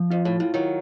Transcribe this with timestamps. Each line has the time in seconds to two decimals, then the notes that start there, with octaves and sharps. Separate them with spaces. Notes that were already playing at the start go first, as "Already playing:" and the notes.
Already playing: F3
0.10 F2 F4
0.25 A2
0.40 A2 F4
0.54 D#3 F#3